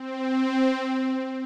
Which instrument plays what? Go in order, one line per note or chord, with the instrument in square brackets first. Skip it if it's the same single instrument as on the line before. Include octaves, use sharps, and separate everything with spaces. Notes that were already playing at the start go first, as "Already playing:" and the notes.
Already playing: [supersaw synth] C4